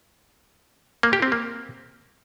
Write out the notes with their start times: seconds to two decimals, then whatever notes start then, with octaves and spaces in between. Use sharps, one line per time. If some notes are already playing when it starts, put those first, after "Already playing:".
1.03 A#3
1.13 G4
1.22 C4
1.32 A#3